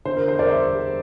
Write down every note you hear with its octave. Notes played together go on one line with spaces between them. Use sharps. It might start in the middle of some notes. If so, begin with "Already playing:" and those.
D3 C5
A#4
E2 C5
A#4 D5
E2 C5 E5
G3